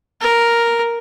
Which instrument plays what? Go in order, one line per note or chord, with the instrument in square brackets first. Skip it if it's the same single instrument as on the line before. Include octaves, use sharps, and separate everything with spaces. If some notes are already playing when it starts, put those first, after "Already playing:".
[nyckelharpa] A#4